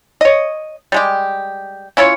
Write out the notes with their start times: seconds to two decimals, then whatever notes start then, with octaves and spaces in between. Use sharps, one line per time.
0.21 C#5 D#5
0.92 G3 G#3 G4
1.97 C#4 E4 F4 C#5